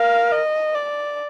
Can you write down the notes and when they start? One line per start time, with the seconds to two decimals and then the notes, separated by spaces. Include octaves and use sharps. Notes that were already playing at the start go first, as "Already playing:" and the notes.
Already playing: A#4 F5
0.32 D#5
0.74 D5